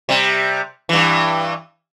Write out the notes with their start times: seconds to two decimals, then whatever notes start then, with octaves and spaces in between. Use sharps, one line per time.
0.09 C3 G3
0.89 G2 E3